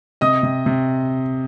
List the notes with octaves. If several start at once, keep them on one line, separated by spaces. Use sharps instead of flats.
C3 D#5 D#6
C3
C3